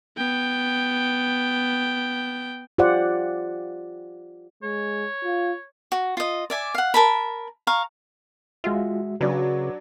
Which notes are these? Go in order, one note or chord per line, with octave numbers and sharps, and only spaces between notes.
B3 G5
F4 G4 C5 D5 F#5
G#3 C#5
F4
F#4
F4 D#5
D5 E5 G#5
F5 F#5
A#4 A5 B5
F5 A#5 C#6
G#3 F4 F#4 E5
C#3 F#3 D4 F#4 B4